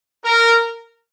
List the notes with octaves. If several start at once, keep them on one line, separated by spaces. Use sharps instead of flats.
A#4